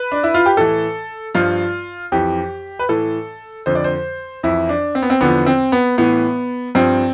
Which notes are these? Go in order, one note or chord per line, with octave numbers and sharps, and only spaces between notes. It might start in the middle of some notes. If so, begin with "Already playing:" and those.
Already playing: B4
D4
E4
F4
G4
A2 E3 A4
G2 F3 F4
F2 E3 G4
B4
A2 E3 A4
F2 D3 F3 C5
D5
C5
F2 E3 E4
D4
C4
B3
C4
E2 D3 F3 B3
C4
B3
A2 E3 B3
G2 F3 C4